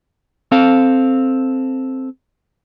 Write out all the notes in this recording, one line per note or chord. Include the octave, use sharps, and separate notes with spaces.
C4 A4 F5